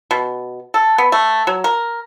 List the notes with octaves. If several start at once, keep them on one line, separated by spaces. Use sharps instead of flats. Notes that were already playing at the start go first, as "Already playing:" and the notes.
B2
A4
B3
A3
F#3
A#4